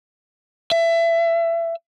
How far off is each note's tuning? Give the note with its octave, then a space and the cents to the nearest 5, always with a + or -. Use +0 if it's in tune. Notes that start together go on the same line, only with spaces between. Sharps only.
E5 +25